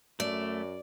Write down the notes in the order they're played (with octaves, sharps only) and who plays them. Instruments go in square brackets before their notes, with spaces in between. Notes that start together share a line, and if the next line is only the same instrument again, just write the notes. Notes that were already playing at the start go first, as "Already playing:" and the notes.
[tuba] F#2 [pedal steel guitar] A3 [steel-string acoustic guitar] D5